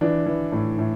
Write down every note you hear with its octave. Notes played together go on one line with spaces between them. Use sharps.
E3 D4
E3
A2
A2